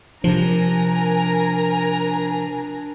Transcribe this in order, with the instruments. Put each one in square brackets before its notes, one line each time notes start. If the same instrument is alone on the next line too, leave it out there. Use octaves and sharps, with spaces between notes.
[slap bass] C3 F3 [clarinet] D4 [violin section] A#4 G#5 A#5